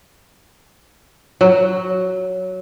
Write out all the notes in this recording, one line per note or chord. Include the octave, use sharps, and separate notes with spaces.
F#3